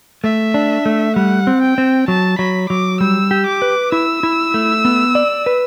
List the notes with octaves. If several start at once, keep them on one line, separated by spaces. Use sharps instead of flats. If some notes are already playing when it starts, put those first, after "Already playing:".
A3 E5
D4
A3
G3 F#5
C4
G5
C4
F#3 A5
F#3 B5
F#3 D6
G3 E6
G4
D6
B4
E4 E6
E4
A3
B3
D5
B4